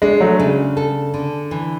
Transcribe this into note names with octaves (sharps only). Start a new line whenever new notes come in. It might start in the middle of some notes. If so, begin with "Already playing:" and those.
G#3 D4
F#3 A3
C#3 G#3
A4
D3
E3